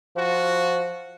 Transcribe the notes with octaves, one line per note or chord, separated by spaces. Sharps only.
F3 F4 F#4